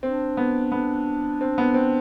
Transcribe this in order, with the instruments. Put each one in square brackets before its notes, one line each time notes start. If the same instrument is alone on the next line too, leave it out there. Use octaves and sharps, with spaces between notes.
[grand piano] C4 [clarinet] D4
[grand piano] B3
B3
C4
B3
C4